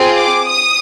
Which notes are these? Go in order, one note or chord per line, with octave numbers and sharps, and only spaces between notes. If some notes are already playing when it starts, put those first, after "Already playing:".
Already playing: C4 F4 G#4
D6
D#6